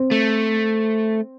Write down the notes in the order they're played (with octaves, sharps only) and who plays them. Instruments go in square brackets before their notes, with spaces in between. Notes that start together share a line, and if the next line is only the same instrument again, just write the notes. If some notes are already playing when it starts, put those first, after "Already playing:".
Already playing: [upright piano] C4
[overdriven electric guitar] A3